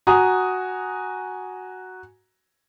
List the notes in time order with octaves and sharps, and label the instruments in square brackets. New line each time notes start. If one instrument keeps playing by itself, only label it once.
[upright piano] F#4 G#5 A#5 D#6